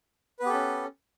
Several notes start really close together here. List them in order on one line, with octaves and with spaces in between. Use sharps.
B4 B3 G4 A4 C#4